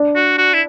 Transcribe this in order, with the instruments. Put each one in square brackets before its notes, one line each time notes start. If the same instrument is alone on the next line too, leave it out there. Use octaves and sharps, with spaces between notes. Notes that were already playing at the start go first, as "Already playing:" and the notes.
Already playing: [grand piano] D4
[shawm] F#4
F#4
E4